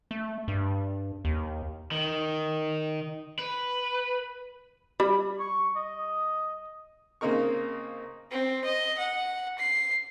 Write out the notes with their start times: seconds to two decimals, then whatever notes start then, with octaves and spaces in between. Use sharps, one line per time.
0.11 A3
0.48 G2
1.25 D#2
1.92 D#3
3.39 B4
5.00 G3 B5
5.40 C#6
5.76 D#5
7.21 C#3 A#3 C4 D#4 A#4 C#6
8.31 C4
8.64 D#5
8.98 F#5
9.58 C7